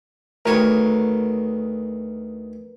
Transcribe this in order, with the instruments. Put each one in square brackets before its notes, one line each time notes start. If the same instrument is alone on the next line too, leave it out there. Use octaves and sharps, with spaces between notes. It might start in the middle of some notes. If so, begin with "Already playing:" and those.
[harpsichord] D2 D#3 C#5 [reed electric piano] A#4 B4